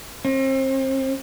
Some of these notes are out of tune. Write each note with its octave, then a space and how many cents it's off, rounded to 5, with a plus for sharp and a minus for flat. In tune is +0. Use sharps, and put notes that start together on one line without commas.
C4 +35